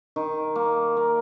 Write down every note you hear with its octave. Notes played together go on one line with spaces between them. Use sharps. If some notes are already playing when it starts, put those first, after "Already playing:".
D#3
A#3
A#3